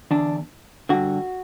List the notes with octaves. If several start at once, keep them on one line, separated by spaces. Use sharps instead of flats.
E2 D3 D4
G2 D3 F#4